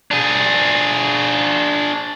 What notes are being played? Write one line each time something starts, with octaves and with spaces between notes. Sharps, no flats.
D4 G#4